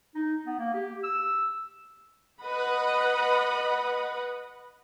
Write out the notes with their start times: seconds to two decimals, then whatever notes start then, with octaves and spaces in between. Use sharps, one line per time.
0.15 D#4
0.46 B3
0.59 A#3
0.74 G4
1.04 E6
2.41 B4 D#5 F#5 B5